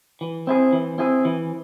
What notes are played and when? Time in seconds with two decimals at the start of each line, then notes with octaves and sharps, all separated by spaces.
0.21 E3
0.47 C4 E4 G#4
0.73 E3
0.98 C4 E4 G#4
1.25 E3